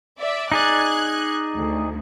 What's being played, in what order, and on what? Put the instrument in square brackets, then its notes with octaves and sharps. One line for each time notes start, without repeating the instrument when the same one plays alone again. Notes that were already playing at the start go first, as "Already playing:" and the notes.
[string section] D5 E5
[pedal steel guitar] D#4 G#4 D5 [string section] F#6 G#6
[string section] D2